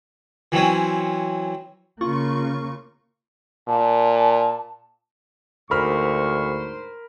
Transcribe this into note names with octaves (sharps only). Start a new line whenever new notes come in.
E3 F#3 C4 C#4
C#3 A#3 F4 C#6
A#2 A5
D2 G#2 A#4 C5 B5 C#6 F6